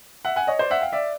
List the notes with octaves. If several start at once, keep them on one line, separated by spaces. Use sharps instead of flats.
E5 F#5
F#5 G#5
C#5 D#5
C5 D5
E5 F#5
F5 G5
D5 E5